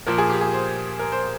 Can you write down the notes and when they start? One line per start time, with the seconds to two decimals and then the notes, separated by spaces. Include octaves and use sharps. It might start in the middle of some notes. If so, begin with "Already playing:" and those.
0.07 A#2 F3 A#4
0.18 G#4
0.30 G4
0.41 G#4
0.53 C5
1.00 A#4
1.12 C5